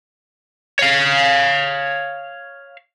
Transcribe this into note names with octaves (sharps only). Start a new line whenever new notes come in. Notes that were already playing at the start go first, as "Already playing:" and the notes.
C#5 F5